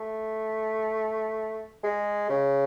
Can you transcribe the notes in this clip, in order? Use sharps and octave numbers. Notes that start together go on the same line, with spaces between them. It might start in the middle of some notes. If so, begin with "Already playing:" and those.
Already playing: A3
G#3
C#3